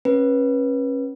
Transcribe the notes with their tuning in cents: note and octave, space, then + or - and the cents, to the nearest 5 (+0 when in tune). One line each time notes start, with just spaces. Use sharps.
C#4 -30 B4 -25